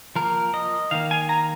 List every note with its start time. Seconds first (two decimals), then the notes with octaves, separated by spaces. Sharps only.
0.16 F3 A#3 A#4
0.54 D#5
0.91 D#3 A#3 F5
1.11 G#5
1.29 A#5